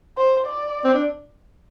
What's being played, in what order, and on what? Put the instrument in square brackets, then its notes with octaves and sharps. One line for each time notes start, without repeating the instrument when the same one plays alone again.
[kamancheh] C5
D5
[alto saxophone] C4
D4